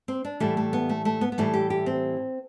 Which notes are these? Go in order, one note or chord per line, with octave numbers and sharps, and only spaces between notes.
C4
D4
A2 E3 G3 A3
A3
B3
A3
A3
B3
B3
A2 E3 G3 A3
G4
G4
C4